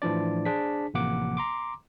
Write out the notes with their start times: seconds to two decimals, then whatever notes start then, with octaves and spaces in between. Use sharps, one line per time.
0.02 A2 E3 F3 D4 D5
0.45 D4 G#4 C5 B6
0.94 A1 C3 F3 A#3 F#5 D6
1.37 A#5 C6 D6